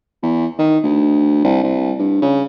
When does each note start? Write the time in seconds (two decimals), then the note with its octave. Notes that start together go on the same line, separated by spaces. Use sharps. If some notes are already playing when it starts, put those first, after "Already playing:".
0.23 E2
0.59 D#3
0.84 D2
1.44 C2
1.63 C2
1.99 G2
2.22 C#3